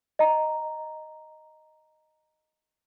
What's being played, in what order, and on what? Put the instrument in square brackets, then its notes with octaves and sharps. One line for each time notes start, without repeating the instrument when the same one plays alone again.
[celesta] D#5 A#5